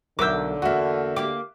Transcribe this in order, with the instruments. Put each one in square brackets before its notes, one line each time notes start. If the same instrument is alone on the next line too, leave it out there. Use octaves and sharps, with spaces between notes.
[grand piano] B1 G6 [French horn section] D3 [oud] F#3 A#4 E5 [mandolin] D6 E6
[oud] E2 A#3 [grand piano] F#4 E5
[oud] A#3 F4 G4 [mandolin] D6